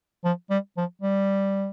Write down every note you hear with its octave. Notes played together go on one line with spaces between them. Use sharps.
F3
G3
F3
G3